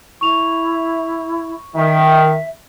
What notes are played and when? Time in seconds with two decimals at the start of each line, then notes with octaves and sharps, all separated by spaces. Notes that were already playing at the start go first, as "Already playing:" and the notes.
0.21 E4 C#6 F7
1.74 D#3 E5